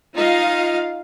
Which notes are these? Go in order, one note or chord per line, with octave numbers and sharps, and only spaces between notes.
D#4 F4 D#5 F5